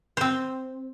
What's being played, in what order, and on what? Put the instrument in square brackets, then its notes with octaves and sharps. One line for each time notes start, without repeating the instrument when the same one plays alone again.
[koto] C4 C5